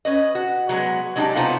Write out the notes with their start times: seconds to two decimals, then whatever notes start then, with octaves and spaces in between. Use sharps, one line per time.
0.05 C#4 B4 D#5
0.35 F#4
0.69 F#3 G#3 B3
1.16 F#3 G#3 D4 D#4 G4
1.36 C3 B3 D#4 F4 C5